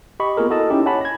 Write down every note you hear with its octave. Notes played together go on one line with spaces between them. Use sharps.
G4 D#5 B5 C#6
A#3 B3 F4 G#4 A#4
E4 F#4 A4 D#5 A5
C#4 D#4 E4 G4
C#5 F#5 G#5 A5 B5
G#6 A#6